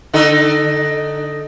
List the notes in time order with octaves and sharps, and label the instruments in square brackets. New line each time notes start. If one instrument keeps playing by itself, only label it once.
[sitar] D3 D#4 A4